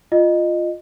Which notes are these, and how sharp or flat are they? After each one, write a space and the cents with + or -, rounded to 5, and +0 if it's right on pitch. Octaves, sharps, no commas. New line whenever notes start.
F4 +0 D#5 -20